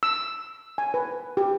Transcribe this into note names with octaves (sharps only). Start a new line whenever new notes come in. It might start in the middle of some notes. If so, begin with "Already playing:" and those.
E6
G#5
B4
G4